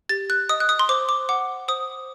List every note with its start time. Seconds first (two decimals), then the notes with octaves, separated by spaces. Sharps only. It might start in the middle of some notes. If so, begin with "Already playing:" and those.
0.09 G4 A6
0.30 F#6
0.49 D#5 D#6
0.60 F#6
0.69 D#6
0.79 C6
0.89 C5 D6
1.09 D6
1.29 F#5 D6
1.68 C5 D#6